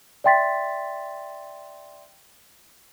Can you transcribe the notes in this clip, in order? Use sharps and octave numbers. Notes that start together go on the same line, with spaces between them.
D5 E5 G5 C6 A6 B6